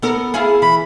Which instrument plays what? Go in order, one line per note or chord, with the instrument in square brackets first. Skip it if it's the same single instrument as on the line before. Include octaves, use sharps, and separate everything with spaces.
[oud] B3 A4 A#4
E4 F4 G#4
[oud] E3 [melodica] B5